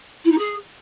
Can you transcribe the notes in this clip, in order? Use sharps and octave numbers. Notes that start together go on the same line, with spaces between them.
E4
D#4
G#4